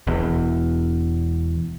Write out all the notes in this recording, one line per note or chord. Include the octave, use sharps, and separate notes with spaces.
E1 E2